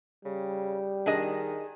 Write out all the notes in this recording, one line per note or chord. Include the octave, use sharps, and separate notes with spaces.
C#3 G3
D#3 D4 G#4 D#5